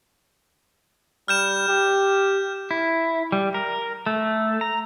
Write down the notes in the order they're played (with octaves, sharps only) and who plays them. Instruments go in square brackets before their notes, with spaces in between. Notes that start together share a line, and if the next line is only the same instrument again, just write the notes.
[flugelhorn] G3 [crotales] F6 G6 E7
[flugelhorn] G4
[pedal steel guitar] E4
G3
A#4
A3
A#5